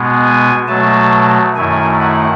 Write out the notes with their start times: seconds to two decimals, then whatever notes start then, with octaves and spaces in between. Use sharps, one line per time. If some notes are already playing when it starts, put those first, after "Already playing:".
Already playing: B2 G#3 B3
0.24 G#5
0.68 B2 F#3 A3 A5
1.56 F#2 D#3 A3 E4 G#5
2.00 F#5